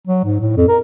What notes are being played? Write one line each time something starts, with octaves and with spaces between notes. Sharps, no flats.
F#3
G#2
A2
F2
A#4